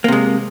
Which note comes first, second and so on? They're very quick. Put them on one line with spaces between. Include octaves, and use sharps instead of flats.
A#3 C3 G#3